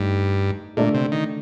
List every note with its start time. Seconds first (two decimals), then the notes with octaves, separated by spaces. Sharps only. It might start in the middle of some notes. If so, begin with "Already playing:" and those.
Already playing: G2 A3 D#4
0.77 A#2 D3 A3 D4 A4 D5
0.94 C3
1.12 D#3